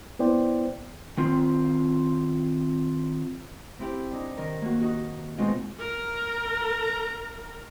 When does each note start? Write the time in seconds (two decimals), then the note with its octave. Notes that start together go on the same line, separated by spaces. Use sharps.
0.19 B3 E4 C5 D5 G5
1.17 D#3 C4 F4
3.79 C4 E4 G4
4.11 D4 D#4
4.37 D#3 A#4
4.62 A#3 F#4
4.82 D#4 F#4
5.38 B2 G#3 C4 D#4 F4
5.78 A#4 A#5